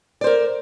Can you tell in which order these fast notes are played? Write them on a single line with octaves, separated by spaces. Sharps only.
D5 C5 A#4